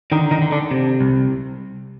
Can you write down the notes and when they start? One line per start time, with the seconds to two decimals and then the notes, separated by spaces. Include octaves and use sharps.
0.12 D3 D#3 D#4
0.31 D#3 D#4
0.42 D3
0.52 D3 D4
0.71 C3
1.01 C2